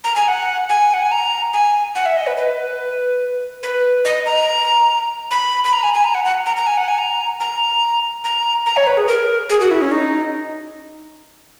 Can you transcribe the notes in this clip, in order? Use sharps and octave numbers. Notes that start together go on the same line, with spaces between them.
A#5
G#5
F#5
G#5
F#5
G#5
A#5
G#5
F#5
E5
D#5
B4
B4
B4
D#5
A#5
B5
B5
A#5
G#5
G#5
A#5
F#5
F#5
A#5
A#5
G#5
F#5
G#5
A#5
A#5
A#5
A#5
C#5
B4
G#4
A#4
G#4
F#4
E4
C#4
D#4